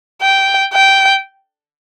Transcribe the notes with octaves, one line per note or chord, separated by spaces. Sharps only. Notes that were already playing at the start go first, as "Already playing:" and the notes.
G5
G5